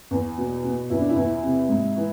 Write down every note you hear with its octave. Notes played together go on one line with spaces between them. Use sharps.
E2
B2
B2
E2 E4
D4
E4
E2
C3
G#2
E3